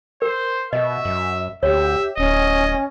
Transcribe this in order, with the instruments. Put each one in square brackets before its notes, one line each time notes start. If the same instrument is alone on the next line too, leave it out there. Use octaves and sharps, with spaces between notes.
[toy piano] A#4 [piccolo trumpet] C5
[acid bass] B2 [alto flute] F#4 [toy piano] D#5 [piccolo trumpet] E5
[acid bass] F#2
[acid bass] D2 [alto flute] G4 [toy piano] C#5 [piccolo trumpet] E5
[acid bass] D1 [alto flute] C#4 [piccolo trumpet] D#5